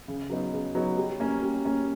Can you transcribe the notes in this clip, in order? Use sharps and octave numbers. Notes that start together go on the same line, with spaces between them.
C#3
F#3 B3 D#4
C#3
F#3 B3 D#4
G3
A#3 C#4
G3
A#3 C#4